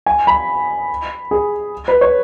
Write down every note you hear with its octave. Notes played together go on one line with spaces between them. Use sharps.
G#5
B5
G#4
B4
C#5